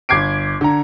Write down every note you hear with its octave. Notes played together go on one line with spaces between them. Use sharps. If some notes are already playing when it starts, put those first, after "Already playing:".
G1 D6 G#6 C7 D7
D3 A#5